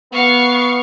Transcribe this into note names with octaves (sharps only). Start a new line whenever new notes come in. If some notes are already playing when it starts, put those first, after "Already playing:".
B3 F5 C#6